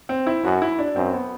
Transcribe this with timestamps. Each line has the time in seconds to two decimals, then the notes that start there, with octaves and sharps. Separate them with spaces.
0.09 C4
0.27 E4
0.44 F#2 F#4
0.62 E4
0.79 D4
0.96 F#2 C4
1.13 B3